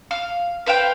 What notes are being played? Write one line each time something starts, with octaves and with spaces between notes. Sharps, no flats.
F5
B4 C5 F5 G5